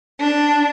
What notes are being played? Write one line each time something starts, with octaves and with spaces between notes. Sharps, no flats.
D4